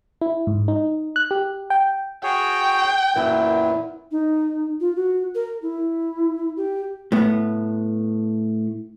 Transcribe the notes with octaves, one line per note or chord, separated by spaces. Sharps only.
E4
G#2
D#4
F#6
G4
G5
F#4 G#4 C#5 G5
F#2 A#2 E3 F#3 B3 E4
D#4
F4
F#4
A#4
E4
G4
A2 B3